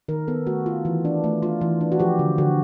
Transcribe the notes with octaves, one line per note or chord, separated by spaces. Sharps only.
D#3 A#4
B3 A4
A3 F#4
F4
E3
D4
A3
F4
E3
D4
F#4
F3 G4
D3
D3 F#4